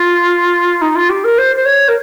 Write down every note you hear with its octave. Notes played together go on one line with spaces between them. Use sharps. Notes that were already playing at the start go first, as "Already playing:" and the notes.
Already playing: F4
D#4
F4
G4
A#4
C5
C5
C#5
A#4